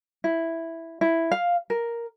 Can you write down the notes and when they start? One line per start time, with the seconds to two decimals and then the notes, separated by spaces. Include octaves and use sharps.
0.24 E4
1.01 E4
1.32 F5
1.70 A#4